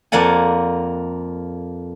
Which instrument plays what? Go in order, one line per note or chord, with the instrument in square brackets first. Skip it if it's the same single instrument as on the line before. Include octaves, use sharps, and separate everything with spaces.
[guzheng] F2 A#3 D5 F#5 G#5